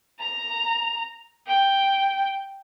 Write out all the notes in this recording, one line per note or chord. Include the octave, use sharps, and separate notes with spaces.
A#5
G5